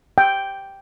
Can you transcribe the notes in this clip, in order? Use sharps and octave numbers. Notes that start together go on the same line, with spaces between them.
G5